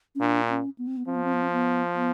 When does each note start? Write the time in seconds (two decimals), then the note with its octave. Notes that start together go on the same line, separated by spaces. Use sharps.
0.15 C#4
0.20 A#2 D4
0.49 C#4
0.78 B3
0.87 C4
0.97 B3
1.06 F3 C4
1.15 B3
1.24 C4
1.33 B3
1.42 C4
1.52 B3
1.95 B3